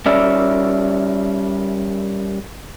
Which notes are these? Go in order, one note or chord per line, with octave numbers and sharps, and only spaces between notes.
G3 C#4 A#4 D5 E5